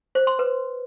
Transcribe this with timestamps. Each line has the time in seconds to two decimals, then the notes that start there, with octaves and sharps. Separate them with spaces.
0.15 C5
0.27 C6
0.39 B4